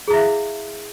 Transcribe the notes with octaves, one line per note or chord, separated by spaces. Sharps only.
E4 G#4 E5 F5